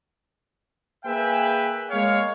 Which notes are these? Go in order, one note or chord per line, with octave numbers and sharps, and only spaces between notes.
A#3 G#4 B4 E5 G5 G#5
G#3 A#3 C#5 F5